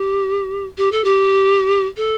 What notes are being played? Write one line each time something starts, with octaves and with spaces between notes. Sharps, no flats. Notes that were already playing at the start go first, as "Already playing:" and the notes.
Already playing: G4
G4
A4
G4
A4